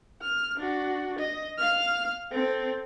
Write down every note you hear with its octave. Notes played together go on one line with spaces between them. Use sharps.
F6
D4 F#4
D#5
F5 F6
C4 A4